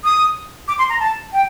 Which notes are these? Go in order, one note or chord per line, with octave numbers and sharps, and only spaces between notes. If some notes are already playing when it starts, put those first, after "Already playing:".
D#6
D6
C6
A#5
A5
G5